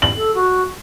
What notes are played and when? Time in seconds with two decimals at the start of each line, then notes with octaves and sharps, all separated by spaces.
0.02 F#7
0.17 A4
0.34 F#4